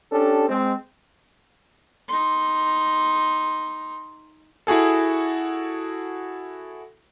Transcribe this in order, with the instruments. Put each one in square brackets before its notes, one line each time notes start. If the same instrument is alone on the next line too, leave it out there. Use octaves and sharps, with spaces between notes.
[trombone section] C#4 D4 G4 A4
G#3 C4
[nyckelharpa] D#4 C6
[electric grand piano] E4 F#4 G#4 A4